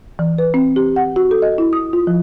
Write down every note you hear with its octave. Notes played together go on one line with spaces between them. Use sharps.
E3
B4
C4
G4
F#5
F#4
A4
D#5
E4
D#6
F4
F3